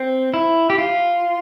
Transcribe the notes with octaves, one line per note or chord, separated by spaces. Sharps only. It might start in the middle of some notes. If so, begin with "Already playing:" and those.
Already playing: C4
E4
G4
F4